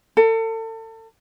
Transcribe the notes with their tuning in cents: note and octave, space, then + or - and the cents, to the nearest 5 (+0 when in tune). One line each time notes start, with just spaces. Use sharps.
A4 +35